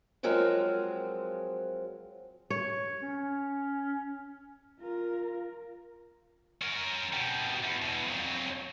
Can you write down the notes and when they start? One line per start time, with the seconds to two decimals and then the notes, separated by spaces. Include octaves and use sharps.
0.23 F3 F#3 G#3 C4 A#4
2.50 C#5
3.03 C#4
4.80 F4 A#4
6.62 C#4 A#4
7.13 B2 G3
7.63 E2
7.82 E2 B2
8.06 F2 F#3